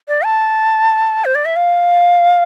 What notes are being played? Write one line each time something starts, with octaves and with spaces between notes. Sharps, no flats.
D5
A5
C5
D5
E5
F5